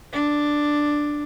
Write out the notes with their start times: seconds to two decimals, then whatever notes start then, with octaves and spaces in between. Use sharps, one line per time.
0.13 D4